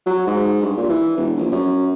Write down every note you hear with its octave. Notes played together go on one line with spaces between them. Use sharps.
F#3
G#2
G2
A#2
E3
E1
A#1
F#2